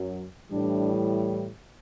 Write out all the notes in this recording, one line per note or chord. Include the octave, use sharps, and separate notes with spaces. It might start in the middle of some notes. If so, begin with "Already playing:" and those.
Already playing: F#2 F#3
A2 E3 G3 D4